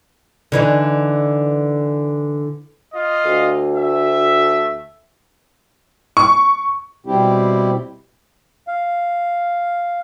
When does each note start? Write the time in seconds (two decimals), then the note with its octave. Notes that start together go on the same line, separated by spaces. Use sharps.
0.52 D3 E3 D#4
2.94 F4 D#5 F5
3.25 D2
3.77 A3 E5
6.17 C#6
7.06 B2 G3 C4 E4 G4
8.68 F5